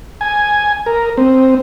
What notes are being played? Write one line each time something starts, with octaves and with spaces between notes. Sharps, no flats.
G#5
A#4
C4